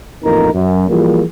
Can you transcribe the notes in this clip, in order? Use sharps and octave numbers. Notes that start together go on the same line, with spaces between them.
A1 F2 A#3 D#4 A#4 A#5
F#2
E3 F3 G3 A#3 F4 G#4